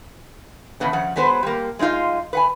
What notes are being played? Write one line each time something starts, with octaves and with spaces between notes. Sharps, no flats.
E2 C#3 B3 D4
C#3 F3 F#5
F#3 G#3 B3 B4 C5
G3 A#3
G#3 C4 D#4 F4 F5
B4 F#5 G#5